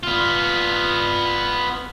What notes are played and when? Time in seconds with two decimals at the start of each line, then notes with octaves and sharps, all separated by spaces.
0.03 B3 F4